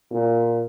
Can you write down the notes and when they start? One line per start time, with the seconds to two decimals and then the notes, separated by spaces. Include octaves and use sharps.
0.11 A#2